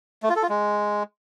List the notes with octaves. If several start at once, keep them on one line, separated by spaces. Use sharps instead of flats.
A3
F4
A4
F4
G#3